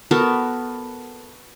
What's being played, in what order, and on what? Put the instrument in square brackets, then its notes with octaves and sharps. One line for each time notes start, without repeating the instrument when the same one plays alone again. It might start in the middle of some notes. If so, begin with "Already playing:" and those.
[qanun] B3 F#4 A4 A#4